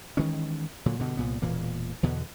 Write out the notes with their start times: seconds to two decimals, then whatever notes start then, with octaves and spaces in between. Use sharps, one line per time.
0.17 D#3 E3 G#3 C#4
0.86 A#2 D3 F#3
1.00 G2 B2 D3
1.17 C2 A#2 B3
1.42 E1 A#2 E3 A#3
2.03 E2 B2 D3 B3